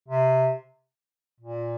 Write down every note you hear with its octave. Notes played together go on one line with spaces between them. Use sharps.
C3
A#2